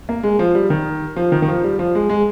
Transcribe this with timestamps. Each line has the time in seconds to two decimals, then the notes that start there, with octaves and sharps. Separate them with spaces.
0.09 A#3
0.23 G#3
0.39 F3
0.55 G3
0.70 D#3
1.16 F3
1.32 D#3
1.42 D#3
1.48 F3
1.64 G3
1.79 F3
1.95 G#3
2.09 G#3